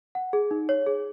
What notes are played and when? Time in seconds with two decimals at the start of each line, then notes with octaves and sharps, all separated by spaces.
0.15 F#5
0.33 G#4
0.51 D#4
0.69 C#5
0.86 G#4